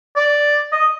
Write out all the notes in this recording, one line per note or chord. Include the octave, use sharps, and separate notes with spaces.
D5
D#5